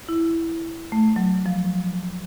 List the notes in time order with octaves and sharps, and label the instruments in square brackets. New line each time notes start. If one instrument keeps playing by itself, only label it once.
[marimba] E4
A3
F#3
F3